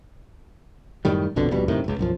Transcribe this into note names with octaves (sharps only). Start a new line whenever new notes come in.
F#2 A2 D#3 G3
A#1 F2 B2 D3
D#1 A#1 B2 G3
F#2 A2 C3 D#3
F#1 C#2
B1 F#2 F3